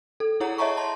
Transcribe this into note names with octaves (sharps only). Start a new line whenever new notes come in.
A4
E4 G#4 C#5 F#5 A#5
C#5 D#5 E5 A5 A#5 C#6
A5 C6